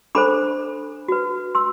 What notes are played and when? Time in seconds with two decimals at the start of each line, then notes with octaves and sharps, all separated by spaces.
0.15 D4 A4 C5 B5 D6
1.08 F#4 B4
1.55 C6 E6